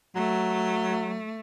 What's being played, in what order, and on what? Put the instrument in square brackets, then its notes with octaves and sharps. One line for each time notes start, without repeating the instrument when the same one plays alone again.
[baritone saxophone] F#3 [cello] A3